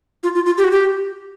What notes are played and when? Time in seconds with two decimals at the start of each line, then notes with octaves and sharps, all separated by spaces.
0.24 F4
0.35 F4
0.46 F4
0.58 G4
0.64 F#4
0.71 G4